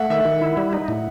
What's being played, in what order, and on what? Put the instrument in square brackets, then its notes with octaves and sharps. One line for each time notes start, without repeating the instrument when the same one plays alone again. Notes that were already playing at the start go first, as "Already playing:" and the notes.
Already playing: [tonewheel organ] A3 [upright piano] E5 F#5
[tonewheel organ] D#3 [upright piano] E5
[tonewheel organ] D#3
E4
G3
D#4
A2